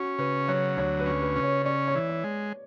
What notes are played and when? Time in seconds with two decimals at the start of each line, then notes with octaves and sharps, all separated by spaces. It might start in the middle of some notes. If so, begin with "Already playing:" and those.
Already playing: C#4 F#4
0.19 C#3 B4
0.48 F#3 C#5
0.77 D2 C#5
0.99 B4
1.06 C#4
1.22 B4
1.36 C#3
1.43 C#5
1.65 C#4 D5
1.88 C#5
1.95 E3
2.09 C#5
2.24 G#3